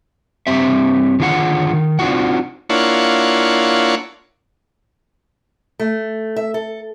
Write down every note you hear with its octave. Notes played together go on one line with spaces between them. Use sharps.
G2 C4 G4 E5
D3 D#3 F4 G#4 C#5 F#5
D#3
C4 D4 D#4 F4 F#4 F#5
A#3 D4 E4 F4 C#5 F#5
A3
E5
A4